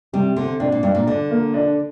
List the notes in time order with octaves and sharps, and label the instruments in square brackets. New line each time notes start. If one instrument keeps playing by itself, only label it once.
[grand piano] C3 [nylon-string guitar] G3
[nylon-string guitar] D3 [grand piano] C4
[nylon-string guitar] C3 [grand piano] D4
[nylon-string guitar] A#2
[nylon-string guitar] G2 [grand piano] D4
[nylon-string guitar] A#2
[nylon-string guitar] D3 [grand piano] D4
[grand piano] A#3
D4